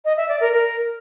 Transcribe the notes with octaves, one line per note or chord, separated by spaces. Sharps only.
D#5
E5
D5
A#4
A#4